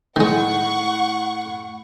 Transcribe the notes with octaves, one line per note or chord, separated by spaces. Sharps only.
A2 D#3 G#3 F#5 C#6